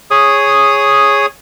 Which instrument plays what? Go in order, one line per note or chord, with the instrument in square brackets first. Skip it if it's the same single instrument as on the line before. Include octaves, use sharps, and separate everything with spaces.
[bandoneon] G#4 C#5 D#6